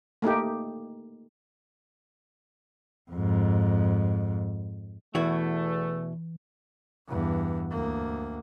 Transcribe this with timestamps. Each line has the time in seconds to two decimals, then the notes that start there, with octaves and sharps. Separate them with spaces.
0.22 A3 A#3 D#4 G4
3.11 F2 G#2
5.15 E2 B2 E3 A3 E4 F#4
7.07 E2 G2
7.71 D2 A#3